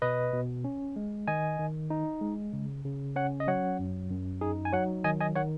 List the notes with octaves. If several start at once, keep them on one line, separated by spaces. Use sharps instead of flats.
B2 B4 D#5
B2
C#4
G#3
D#3 D#5 G#5
D#3
D#4
G#3
C#3
C#3
C#4 C#5 F#5
D#5
F#3 C#5 F#5
F#2
F#2
D#4 G#4
G#5
F#3 C#5 F#5
D#3 D#5 G#5
D#5 G#5
D#3 C#5 F#5